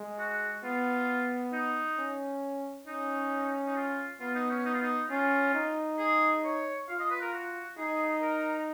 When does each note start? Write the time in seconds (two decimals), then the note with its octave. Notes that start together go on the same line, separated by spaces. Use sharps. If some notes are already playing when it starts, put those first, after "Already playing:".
Already playing: G#3
0.19 F#4
0.64 B3 F4
1.53 D#4
1.98 C#4
2.87 C#4 D#4
3.67 D#4
3.76 F4
4.20 B3 F4
4.35 D#4
4.50 C#4
4.65 D#4
4.74 F4
4.82 D#4
5.10 C#4 F4
5.54 D#4
5.98 G#4
6.44 C#5
6.89 F4 F5
7.00 D#5
7.10 B4
7.22 A#4
7.33 F#4
7.77 D#4 G#4
8.22 A#4